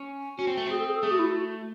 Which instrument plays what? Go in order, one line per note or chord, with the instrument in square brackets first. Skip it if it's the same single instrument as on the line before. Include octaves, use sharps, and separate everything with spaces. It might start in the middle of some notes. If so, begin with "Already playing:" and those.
Already playing: [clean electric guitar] C#4
[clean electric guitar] C#4 [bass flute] F#4
[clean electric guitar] C4
A3
[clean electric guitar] C4 [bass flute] G#4
[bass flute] A4
G#4
A4
[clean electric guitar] A3 [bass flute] G#4
[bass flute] F#4
E4
F#4